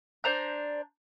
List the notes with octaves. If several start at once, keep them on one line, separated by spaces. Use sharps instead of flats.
D4 C5 A#5 G6